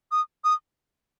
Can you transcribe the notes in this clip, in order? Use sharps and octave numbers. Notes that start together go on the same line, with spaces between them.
D#6
D#6